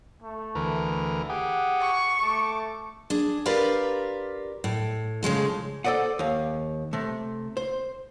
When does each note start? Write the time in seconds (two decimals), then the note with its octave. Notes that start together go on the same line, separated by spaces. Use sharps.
0.22 A3
0.55 D2 E3 A#4
1.30 G4 G#4 F#5
1.81 C#6
2.23 A3 A5 D6
3.10 D4 G#4
3.45 F4 G4 A#4 B4 D5 F5
4.64 A2
5.23 C#3 F3 G#3 A3
5.85 A4 C5 D5 D#5 F#5
6.19 D#2 F5
6.93 C3 A3
7.57 C5